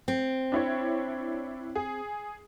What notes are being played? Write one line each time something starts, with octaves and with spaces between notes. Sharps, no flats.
C4
D4 E4 C#5
G#4